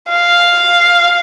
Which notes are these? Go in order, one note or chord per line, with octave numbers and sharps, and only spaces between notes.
F5